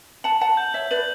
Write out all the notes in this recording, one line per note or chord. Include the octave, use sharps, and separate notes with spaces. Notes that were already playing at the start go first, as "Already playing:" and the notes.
F#5 A5 F#7
F#5 A5
G6
C#5 E5
B4 D5 F#7